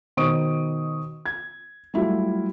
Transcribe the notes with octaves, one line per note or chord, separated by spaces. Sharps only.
B2 D#3 C5 C#6 D#6 D7
G#6
F#3 G3 A3 E4 F4